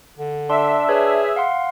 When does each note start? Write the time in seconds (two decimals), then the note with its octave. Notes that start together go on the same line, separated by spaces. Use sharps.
0.19 D3
0.50 D4 E5 C6
0.88 G#4 B4 C#5
1.36 F5 F#5 C6